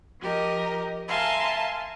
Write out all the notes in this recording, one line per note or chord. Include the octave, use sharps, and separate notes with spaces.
F3 G4 A#4 D#5
A#4 E5 F5 G#5 A5 C6